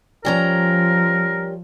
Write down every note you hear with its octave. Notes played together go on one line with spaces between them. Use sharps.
F3 G3 C#4 A#4 A#5